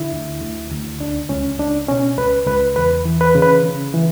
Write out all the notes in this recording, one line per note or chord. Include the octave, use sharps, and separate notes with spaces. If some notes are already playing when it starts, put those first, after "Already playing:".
Already playing: D3 E4
D2
D2
D2
C#2 D4
C#2 C#4
C#2 D4
B2 C#4
C#2 B4
C#2 B4
E2 B4
E3
B4
C#3
B4
C#3
E3